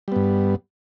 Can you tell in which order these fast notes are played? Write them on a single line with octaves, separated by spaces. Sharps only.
G3 B3 G2